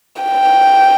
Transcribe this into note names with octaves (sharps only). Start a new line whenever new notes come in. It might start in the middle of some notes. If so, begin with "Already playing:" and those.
G5